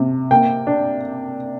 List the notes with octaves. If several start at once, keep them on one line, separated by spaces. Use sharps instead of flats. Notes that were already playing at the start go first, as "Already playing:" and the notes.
Already playing: C3
A#3 G5
D4